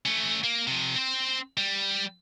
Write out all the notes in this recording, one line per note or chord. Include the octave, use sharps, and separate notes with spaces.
A3 C#4
A#3
C3 F3
C4 C5
G3